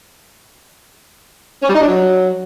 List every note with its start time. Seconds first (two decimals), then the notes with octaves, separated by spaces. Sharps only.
1.62 C#4
1.69 G3
1.75 D#4
1.81 D4
1.87 F#3